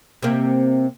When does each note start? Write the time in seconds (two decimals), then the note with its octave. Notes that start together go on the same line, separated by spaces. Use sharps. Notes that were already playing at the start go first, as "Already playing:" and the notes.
0.22 C3 A#3